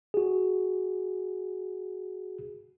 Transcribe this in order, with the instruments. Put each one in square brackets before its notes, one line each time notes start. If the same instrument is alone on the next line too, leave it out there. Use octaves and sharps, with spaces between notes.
[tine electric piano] F#4 G#4